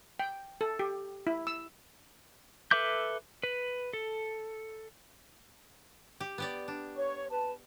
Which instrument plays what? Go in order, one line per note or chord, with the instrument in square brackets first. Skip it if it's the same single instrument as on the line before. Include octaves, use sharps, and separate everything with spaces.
[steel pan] G5
A4
G4
E4
E6
[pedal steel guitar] A4 B4 E5 D6 G6
B4
A4
[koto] G4
B3 G4 D5
D4
[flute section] C#5 C#6
B4 A5